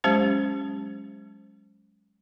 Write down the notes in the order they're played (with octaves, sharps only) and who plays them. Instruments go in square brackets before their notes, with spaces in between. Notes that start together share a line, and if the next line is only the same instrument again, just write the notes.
[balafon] F#3 G#3 C#4 G4 C5